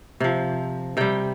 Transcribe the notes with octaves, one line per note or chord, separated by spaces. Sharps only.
C3 F3
C3 G3 G5